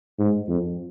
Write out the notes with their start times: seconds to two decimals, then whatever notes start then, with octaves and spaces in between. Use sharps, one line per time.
0.19 G#2
0.48 F2